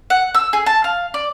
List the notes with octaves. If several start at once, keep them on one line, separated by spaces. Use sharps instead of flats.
F#5
E6
G#4
A5
F5
D5